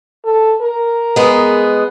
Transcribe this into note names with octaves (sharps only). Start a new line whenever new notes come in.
A4
A#4
G#3 B3